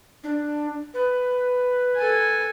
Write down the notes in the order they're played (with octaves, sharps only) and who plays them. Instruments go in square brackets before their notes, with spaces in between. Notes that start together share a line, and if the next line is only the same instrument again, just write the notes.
[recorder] D4
B4
[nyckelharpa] A4 G#5